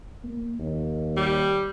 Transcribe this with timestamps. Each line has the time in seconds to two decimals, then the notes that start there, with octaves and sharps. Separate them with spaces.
0.24 A#3
0.59 D#2
1.17 G3